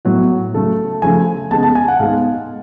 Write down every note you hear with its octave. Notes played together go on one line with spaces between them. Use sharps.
A2 F#3 B3 F#4
C#3 F#3 A3 A4
C#3 F3 A3 G#5
C#3 G#3 B3 A5
A5
G#5
F#5
G#2 G#3 B3 F5